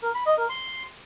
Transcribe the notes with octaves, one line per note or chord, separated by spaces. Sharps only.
A#4
B5
D#5
A#4
C6